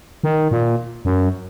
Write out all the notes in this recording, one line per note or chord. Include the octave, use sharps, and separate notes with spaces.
D#3
A#2
F#2